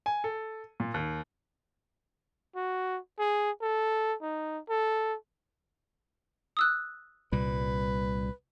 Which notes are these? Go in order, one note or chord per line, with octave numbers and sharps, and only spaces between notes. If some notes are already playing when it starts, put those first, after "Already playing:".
G#5
A4
A#2
D#2
F#4
G#4
A4
D#4
A4
D#6 E6 F#6
C2 A#2 G3 B4